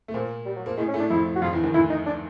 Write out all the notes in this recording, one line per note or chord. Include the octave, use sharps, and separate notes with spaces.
A3
A#2 F3 A#3
G3
F#3
F3 A#3
A2 G#3 A3
C#4
A2 A3
D4
F2 F3 E4
F#4
F2 F3 F4
E2 E3
D#2 D#3
D2 D3 E4
D#4
D4